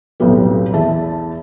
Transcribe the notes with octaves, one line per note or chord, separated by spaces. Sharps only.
B1 F2 A2 G3 B3
E2 E4 E5 A5